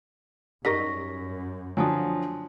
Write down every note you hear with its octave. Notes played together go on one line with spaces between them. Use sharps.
F#2 G3 D#4 A#4 C#6 A#6 B6
D3 F3 F#3 G#5 A5 D#6